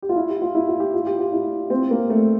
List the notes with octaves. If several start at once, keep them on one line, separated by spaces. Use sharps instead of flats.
G4
F4
E4
G4
F4
E4
F4
G4
F4
G4
F4
E4
C4
A#3
A3